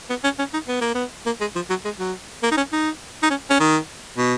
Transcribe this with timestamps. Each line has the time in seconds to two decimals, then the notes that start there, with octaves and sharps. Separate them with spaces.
0.09 B3
0.24 C#4
0.38 C#4
0.53 D#4
0.68 B3
0.81 A#3
0.94 B3
1.26 A#3
1.41 G#3
1.55 F3
1.69 F#3
1.85 G#3
1.99 F#3
2.43 A#3
2.51 D#4
2.57 C#4
2.72 D#4
3.22 D#4
3.30 C#4
3.50 C#4
3.60 D#3
4.17 B2